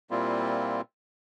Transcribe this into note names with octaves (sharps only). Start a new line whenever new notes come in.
A#2 G3 A#3 C4 E4 F4